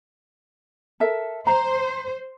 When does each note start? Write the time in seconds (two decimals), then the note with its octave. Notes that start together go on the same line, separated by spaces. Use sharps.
1.00 A4 A#4 E5
1.47 C5 A#5